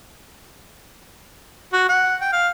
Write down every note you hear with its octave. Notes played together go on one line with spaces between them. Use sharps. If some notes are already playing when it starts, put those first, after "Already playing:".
F#4
F#5
G5
F5